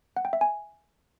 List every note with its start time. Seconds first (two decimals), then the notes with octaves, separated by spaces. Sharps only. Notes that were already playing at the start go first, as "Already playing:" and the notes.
0.17 F#5
0.25 G5
0.33 E5
0.41 G#5